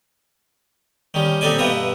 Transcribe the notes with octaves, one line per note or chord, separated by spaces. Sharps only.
D#3 G3 C#4
C4 D#4 G4 A4 D5 G#5
G2 B2 F4 B4 E5 A#5